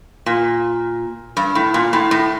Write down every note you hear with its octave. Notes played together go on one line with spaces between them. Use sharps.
A#2
G2
A2
A#2
A2
A2